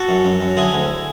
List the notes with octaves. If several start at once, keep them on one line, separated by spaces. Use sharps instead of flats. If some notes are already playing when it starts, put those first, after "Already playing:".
Already playing: F#4 A4
F#2
F#2
F#2
D3 E4 G#4
D2